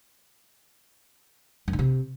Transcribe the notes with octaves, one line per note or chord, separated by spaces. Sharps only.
F#2
D3
C3